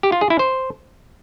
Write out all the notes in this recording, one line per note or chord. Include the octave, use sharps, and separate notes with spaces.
G4
F4
G#4
E4
C5